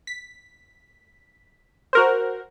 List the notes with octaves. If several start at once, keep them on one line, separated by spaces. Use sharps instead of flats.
B6
F#4 A#4 C5